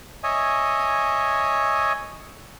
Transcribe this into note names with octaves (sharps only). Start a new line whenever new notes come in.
C#5 D#5 E5 G#5